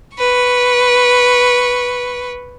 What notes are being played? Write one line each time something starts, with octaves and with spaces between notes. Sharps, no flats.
B4 C#6